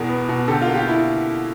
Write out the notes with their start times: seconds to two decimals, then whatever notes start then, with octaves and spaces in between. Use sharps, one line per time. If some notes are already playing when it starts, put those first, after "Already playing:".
Already playing: E2 B2 G#4 A#4
0.09 B3
0.29 B2
0.48 D3 G4 A4
0.62 F4
0.68 A#3
0.74 F4 G4
0.88 E4